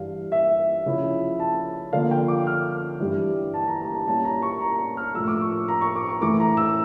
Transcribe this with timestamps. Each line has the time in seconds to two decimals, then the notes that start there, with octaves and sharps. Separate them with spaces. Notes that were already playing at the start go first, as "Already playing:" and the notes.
Already playing: G2 E3 G3 D4 F5
0.32 E5
0.86 C#3 F3 C#4 E4
1.40 A5
1.93 D3 F3 A#3 F5
2.11 G5
2.28 D6
2.47 F6
3.00 G2 E3 G3
3.54 A5
3.67 A#5
3.81 A#5
3.94 A5
4.07 A#2 G3 C#4 E4 A5
4.25 A#5
4.42 C#6
4.61 A#5
4.78 A#5
4.97 F6
5.14 A2 F3 A3 E6
5.28 D6
5.41 C#6
5.68 A#5
5.81 C#6
5.96 D6
6.09 C#6
6.21 A2 E3 A3 D6
6.40 A#5
6.57 E6